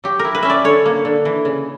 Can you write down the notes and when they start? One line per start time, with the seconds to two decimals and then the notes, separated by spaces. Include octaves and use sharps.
0.04 F#3 G4
0.19 A#4
0.25 E4
0.35 B4
0.43 C#4 E5
0.50 D5
0.64 D3 C#5
0.86 A#3
1.05 D3
1.25 E3
1.45 C#3